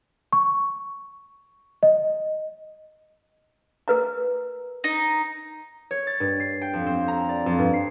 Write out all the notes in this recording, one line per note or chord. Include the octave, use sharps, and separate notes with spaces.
C#6
D#5
A#4 B4 A#5
D#4
C#5
A6
G2
C7
G5
F2
C4
A#5
D5
F2
G2
C7